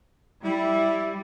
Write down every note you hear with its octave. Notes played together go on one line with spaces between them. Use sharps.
G3 E4